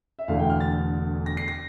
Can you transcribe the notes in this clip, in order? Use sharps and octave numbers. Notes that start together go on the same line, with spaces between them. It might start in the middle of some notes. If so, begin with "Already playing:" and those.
E5
E1 E2 D3 A3 F5
G5
F6
A6
A#6
C7
A#6